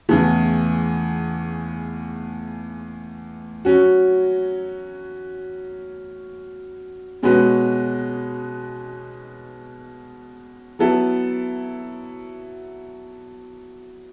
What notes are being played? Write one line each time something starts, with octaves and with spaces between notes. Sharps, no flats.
E2 C#3 E3 A3
F#3 C#4 F#4
B2 G#3 C#4 F#4 B4
F#3 B3 E4 A4